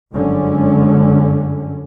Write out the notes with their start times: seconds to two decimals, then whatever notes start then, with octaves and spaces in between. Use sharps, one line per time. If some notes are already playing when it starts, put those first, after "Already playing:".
0.14 G1 F#2 D3 G#3 C#4